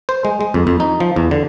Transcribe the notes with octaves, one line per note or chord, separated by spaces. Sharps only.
C5
G#3
G#3
F2
F2
D#4
F3
E2
D3